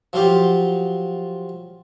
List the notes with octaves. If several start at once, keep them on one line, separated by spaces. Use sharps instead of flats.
F3 F#3 F4 G4